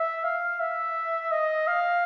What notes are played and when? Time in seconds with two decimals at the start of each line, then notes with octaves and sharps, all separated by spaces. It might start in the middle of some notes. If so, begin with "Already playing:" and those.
Already playing: E5
0.24 F5
0.60 E5
1.32 D#5
1.68 F5